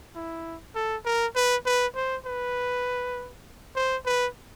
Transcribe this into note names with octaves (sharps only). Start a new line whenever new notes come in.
E4
A4
A#4
B4
B4
C5
B4
C5
B4